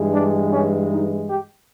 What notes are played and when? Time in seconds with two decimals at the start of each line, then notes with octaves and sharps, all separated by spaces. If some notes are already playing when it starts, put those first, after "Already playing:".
Already playing: G2 E3 G#3
0.12 D4
0.51 C#4
0.89 D#4
1.27 G4